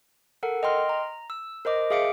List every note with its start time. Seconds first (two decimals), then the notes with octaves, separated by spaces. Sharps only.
0.43 A4 A#4 F#5
0.63 D#5 G5 C6 F6
0.89 A#5
1.30 E6
1.65 A#4 C5 D#5 D6
1.90 G#4 E5 F5 D6 C#7 D7